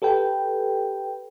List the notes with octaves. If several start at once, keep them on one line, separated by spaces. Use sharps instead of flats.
G4 A4 B4 G5